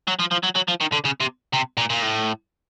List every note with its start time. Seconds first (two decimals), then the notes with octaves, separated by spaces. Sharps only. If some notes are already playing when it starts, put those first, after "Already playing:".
0.08 F#3
0.20 F3
0.32 F3
0.44 F#3
0.56 F#3
0.68 F3
0.81 D#3
0.92 D3
1.05 C#3
1.21 C3
1.54 C3
1.77 A#2
1.90 A#2
2.02 A2